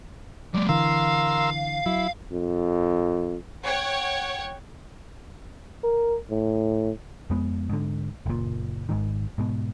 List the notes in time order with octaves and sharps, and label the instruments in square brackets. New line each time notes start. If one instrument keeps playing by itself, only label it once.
[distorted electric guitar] F#3 G#3 [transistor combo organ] D5
[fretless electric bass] D3 E3 [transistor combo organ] A#4 C6 E6 [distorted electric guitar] F5
[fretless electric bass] F#3 [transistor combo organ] E4
[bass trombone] F2
[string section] C#5 F#5 G5
[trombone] A#4
A2
[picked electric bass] F2 G#3 B3
G#2 D3
F#1 A#2
G#1 G#2 D#3
G#2 B2